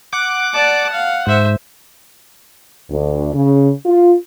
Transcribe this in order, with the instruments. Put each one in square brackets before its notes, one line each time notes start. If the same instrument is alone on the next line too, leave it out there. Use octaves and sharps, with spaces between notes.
[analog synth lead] F#5 [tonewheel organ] D6
[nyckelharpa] D5 A5
F5
[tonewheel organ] G#2 [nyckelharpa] C5 E5
[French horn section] D2
C#3
F4